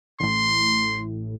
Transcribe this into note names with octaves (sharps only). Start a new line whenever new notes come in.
A1 A2 C6